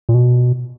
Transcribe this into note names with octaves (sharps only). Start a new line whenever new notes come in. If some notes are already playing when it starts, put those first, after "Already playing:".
A#2
B2